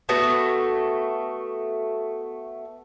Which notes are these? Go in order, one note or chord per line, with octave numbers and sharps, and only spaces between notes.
A3 B3 F#4